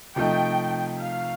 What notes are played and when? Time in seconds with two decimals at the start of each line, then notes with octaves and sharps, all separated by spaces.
0.16 C3 F3 A3 D#4 G5
1.00 F5